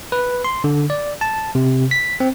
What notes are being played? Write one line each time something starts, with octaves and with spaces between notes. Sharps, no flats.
B4
C6
D3
D5
A5
C3
B6
C4